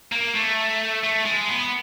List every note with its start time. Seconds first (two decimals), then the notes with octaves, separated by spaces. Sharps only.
0.12 A#3
0.35 A3
1.03 A3
1.25 G#3
1.49 B3